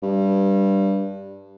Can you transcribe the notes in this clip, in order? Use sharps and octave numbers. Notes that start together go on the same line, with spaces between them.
G2